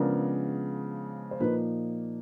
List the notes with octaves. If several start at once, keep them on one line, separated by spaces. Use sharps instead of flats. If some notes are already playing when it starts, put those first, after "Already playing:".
Already playing: C#3 F3 G#3 B3 D4 A#4
C5
A#2 F3 A#3 D#4 B4